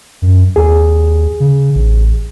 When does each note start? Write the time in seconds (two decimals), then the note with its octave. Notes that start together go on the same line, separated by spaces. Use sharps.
0.22 F#2
0.56 D#2 G#4
1.40 C#3
1.75 A1